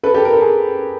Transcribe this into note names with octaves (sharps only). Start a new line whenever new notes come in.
A4 B4
G4 A4
A#4
A4
G#4 A#4